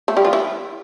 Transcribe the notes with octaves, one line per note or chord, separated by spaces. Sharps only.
A3 A4
G3 G4
F3 F4
E3 E4